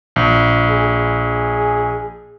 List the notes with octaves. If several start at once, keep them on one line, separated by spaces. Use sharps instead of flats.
A#1
G#4